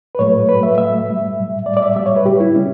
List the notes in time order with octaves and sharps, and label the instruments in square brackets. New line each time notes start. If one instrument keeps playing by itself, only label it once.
[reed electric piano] B4
A2 F#3 A3 C#5
A2 F#3 A3 B4
E5
A2 F#3 A3 E5
A2 G3
A2 G3
A2 G3 D5
D5
E5
A2 G3 E5
C#5
B4
C#3 G3 G4
E4
C#3 G3 C#4